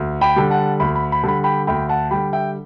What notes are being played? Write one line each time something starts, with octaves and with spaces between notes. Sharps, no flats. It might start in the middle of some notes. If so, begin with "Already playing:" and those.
Already playing: D2
G5 B5
D3 G3
F#5 A5
D2 B5
B5
B5
D3 G3 B5
G5 B5
D2 G5 B5
F#5 A5
D3 G3 G5 B5
E5 G5